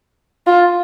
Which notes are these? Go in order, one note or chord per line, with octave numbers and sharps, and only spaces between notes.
F4